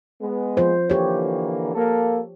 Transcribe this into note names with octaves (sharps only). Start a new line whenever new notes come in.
G#3 B3
F3 F4 C5
D3 E3 A#3 G4 C#5
A#3 A4